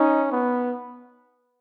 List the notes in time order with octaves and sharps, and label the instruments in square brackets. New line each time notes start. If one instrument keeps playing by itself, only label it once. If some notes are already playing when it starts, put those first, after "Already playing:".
Already playing: [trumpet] C#4 [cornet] D#4
[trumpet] B3